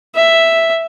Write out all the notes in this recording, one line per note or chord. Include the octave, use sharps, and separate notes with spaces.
E5